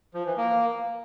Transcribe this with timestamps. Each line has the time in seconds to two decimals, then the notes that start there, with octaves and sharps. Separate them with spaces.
0.14 F3
0.26 E3
0.37 A#3